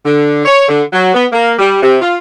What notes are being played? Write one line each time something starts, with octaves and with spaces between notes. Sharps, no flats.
D3
C#5
D3
F#3
B3
A#3
G3
C3
F4